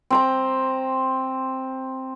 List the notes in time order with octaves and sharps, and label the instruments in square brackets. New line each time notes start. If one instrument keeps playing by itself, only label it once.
[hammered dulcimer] C4 C5 A#5